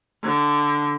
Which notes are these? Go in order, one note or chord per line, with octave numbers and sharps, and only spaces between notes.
D3